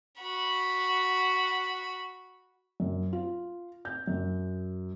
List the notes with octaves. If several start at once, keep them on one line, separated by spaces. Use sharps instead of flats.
F#4 B5
F#2
F4
G6
F#2